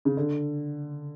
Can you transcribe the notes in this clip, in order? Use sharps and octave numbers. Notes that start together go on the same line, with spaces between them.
C#3
D3